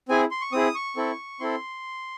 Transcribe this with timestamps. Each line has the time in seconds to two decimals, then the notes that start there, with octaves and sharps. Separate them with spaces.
0.09 C4 E4 G#4 G#5
0.31 C6
0.41 C#6
0.52 C4 E4 G#4 D#6
0.75 C#6
0.96 C4 E4 A4
1.40 C4 E4 A4 C6